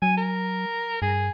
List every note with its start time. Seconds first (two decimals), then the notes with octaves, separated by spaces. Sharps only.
0.02 F#3 G#5
0.17 A#4
1.02 G2 G#4